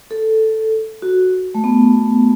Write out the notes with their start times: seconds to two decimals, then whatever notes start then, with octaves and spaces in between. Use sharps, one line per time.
0.11 A4
1.02 F#4
1.55 A3
1.64 B3